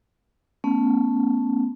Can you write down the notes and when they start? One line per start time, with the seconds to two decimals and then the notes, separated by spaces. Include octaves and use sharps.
0.64 A3 B3 C#4